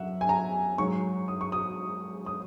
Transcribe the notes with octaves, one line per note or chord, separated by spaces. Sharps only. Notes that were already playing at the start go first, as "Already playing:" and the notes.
Already playing: F#2 E5 F#5
G#5
A#5
G#2 F#3 C#6
D#6
C#6
D#6
D#6